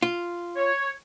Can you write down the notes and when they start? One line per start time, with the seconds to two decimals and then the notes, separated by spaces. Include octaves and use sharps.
0.02 F4
0.57 C#5